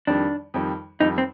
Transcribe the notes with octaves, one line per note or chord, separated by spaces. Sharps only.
F2 D#3 G3 D4
F2 D#3 G3
F2 D#3 G3 D#4
C4